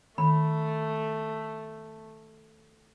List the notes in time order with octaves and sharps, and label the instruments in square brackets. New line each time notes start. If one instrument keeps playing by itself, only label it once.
[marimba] D#3 [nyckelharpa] A3 [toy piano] B5